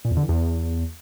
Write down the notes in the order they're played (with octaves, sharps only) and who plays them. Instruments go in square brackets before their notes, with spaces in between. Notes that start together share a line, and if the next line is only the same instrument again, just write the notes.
[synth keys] A#2
E2
D3
E3
E2